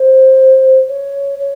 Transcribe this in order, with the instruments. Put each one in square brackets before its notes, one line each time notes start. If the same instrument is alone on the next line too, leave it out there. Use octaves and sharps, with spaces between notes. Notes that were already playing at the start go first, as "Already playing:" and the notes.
Already playing: [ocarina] C5
C#5
C#5